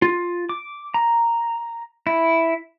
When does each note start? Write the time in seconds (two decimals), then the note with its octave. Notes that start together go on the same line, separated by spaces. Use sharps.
0.02 F4
0.49 D6
0.94 A#5
2.07 E4